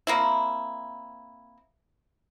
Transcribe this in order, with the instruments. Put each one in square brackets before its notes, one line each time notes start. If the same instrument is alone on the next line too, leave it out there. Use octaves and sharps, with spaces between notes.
[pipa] A#3 C4 E4